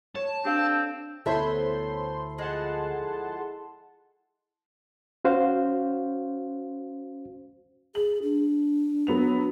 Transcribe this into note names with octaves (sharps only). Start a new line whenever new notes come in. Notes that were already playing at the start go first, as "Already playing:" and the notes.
C#5 A5
C4 D4 G4 A4 F5
D2 B3 E4 A4 C5 C#5 E5 C6
F3 G#3 G#4 F#5 A5 C6
C#4 F#4 C5 F5
G#4 F#7
D4
F#3 B3 F7